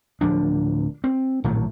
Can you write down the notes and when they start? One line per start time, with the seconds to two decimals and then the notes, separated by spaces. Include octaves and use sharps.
0.21 D1 F3 D4
1.04 C4
1.44 A#1 A2 D#3 F#3